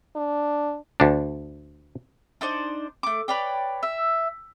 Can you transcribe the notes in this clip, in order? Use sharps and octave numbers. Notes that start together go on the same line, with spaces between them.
D4
D2 D4
D4 D#4 C5 D5
A3 D6
B4 C#5 D5 G5
E5